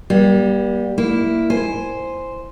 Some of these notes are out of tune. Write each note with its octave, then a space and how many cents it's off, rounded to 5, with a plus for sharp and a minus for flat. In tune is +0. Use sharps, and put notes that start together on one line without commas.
G3 +0 A#3 +45
A#3 +0 E4 +0
C5 +0 G#5 +0